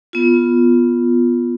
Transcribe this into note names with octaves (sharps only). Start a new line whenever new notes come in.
B3 F4